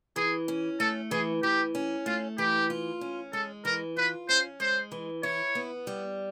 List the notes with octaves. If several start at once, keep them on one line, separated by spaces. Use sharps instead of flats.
E3 G#4
C#4
A3 A4
E3 G#4
E3 G4
C#4
A3 F4
E3 G4
F4
C#4
G#3 A4
E3 A#4
F4 B4
C#4 C5
G#3 C5
E3
E4 C#5
B3
G3